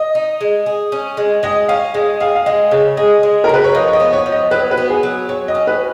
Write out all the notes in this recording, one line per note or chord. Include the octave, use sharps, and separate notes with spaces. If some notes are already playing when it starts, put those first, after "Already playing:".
Already playing: D#5
D#4
G#3
G#4
C#4
G#3
G#3 D#5
C#4 F5
G#3 D#5
G#4 F5
F5
G#3 D#5
C#3 C#5
G#4 D#5
G#3
A#4
C#3 B4
C#5
F3 D#5
C#5
D#5
B3
C#5
F3
D#5
F#3 B4
B4
B3
G#4
F#3
F#3 C#5
D#5
C#4
B4